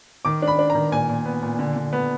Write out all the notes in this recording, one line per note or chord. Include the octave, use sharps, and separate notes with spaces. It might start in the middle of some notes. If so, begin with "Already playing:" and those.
D#3 D6
D4
B5
D4
A#5
D#3
A#2 G#5
A#2
B3
A#2
D3
D3
B3